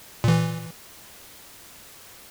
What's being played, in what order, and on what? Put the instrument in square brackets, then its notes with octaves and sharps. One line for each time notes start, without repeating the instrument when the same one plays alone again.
[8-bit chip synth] A#2 E3